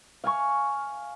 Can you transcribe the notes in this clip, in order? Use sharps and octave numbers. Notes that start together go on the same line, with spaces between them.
F5 G#5 C#6